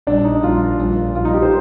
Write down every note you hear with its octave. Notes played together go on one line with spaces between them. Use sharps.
A#1 A#2 G3 D4
D#4
A#1 A#2 G3 F4
A#1 A#2 G3
A#1 A#2 G3 F4
D#4
G4
C5